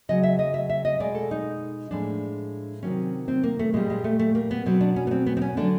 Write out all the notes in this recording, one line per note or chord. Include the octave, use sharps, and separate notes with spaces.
C#3 F#3 D#5
E5
D#5
E5
E5
D#5
B2 G#3 D5
A4
D#4
A2 F3 G#3 D4
C3 D#3 F#3 C#4
C4
A#3
A3
A#2 G3 G#3
G#3
A3
A3
A#3
B3
B2 F#3 C4
D4
C#4
B3
C4
B3
C4
C#4
D3 F#3 D4